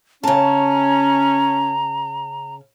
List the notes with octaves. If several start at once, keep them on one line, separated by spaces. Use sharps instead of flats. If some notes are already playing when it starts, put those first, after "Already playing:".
C#3 C#4 A5 A#5